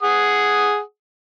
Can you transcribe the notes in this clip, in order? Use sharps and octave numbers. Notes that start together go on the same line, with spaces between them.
G#4 F#5 D#6